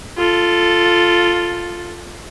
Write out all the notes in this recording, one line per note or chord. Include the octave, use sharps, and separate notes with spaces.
F4 A4